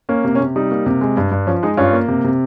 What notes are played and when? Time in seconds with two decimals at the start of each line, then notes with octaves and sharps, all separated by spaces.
0.09 A#3 C#4
0.24 C3
0.35 C#4
0.40 C3
0.56 G3 D#4
0.71 A#3
0.86 C3
1.01 G#3
1.17 G2
1.31 G2
1.47 F3 C#4
1.63 G#3 D#4
1.77 G2 C#4 F4
1.93 A#3
2.08 C3
2.24 C3